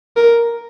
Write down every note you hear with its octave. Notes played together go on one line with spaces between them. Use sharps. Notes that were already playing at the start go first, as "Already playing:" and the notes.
A#4